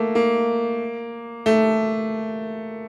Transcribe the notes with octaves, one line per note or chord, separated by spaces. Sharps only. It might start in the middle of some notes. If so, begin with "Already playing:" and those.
Already playing: A3 A#3
A#3
A3